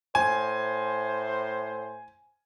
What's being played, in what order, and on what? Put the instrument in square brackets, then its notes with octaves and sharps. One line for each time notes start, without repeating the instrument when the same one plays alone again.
[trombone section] A2 C5 [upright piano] G#5